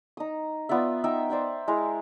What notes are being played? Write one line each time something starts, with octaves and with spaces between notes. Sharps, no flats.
D#4 D#6
B3 F4 D5 E5
D#4 E5 G5
C5 D5 E5 G5
G#3 E4 A#4